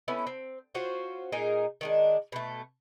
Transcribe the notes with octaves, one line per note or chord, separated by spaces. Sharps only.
A3 B3 C#4 E4
C4
C#4 F4 F#4 C5
A#2 D#4 G#4 A#4
D#3 G#3 D4
B2 A3